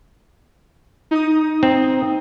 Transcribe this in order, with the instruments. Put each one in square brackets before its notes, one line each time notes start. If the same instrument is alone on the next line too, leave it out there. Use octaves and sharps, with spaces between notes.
[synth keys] D#4 D#6
[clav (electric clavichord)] C4